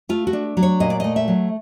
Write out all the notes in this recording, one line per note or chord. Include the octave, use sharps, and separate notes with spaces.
A3 F4
F#4
D4
F#3
C#5
A#2 D#5
D5
A3 D#5
E5
F#3